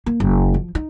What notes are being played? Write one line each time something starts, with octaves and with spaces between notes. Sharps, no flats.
A#3
F#1
F3
D#4